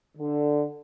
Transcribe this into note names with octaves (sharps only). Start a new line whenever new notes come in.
D3